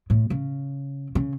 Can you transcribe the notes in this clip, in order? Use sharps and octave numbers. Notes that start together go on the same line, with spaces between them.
A2
C#3
C#3